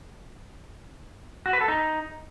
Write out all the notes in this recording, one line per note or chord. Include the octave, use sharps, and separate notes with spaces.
F#4
B4
A4
D#4